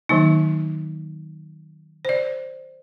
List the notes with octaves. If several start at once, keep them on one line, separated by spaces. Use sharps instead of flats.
D#3 F#3 A#3 D#4
C5 D5